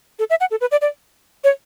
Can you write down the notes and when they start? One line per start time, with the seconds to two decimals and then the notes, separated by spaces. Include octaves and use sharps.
0.19 A4
0.30 E5
0.41 F#5
0.51 A4
0.61 B4
0.71 D5
0.82 D5
1.44 C#5